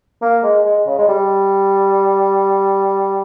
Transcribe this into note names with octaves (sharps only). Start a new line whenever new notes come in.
A#3
G#3
G#3
C#3
G#3
G3